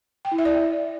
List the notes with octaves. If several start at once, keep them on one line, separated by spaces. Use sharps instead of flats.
G5
E4
E5
D5